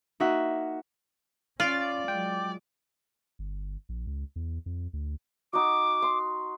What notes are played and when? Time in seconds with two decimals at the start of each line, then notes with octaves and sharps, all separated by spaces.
0.20 A#3 D#4 F#4 E5 F#5
1.60 C#4 F4 D5 F5
2.08 F#3 G#3 G5
3.39 G1
3.89 A#1
4.07 C#2
4.36 E2
4.66 F2
4.93 D2
5.53 D#4 F#4 D6
6.02 C6